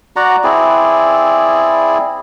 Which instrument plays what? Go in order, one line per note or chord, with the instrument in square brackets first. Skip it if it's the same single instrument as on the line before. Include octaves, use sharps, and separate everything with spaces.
[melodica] F#4 D5 F#5 A#5
C4 E4 G#4 D5